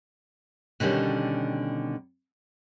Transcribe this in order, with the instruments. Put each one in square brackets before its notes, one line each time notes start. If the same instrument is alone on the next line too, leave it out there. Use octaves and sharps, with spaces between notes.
[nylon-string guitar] B2 D3 D#3 G3 C#4